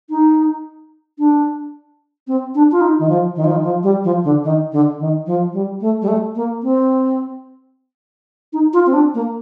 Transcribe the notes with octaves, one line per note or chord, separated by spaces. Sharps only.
D#4
D4
C4
D4
F4
D#4
D#3
F3
D#3
F3
D#3
F3
G3
F3
D3
D#3
D3
D#3
F3
G3
A3
G3
A3
A#3
C4
D#4
F4
C4
D4
A#3